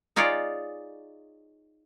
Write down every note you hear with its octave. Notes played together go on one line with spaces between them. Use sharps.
D#4 F4 G#4 C#5 D5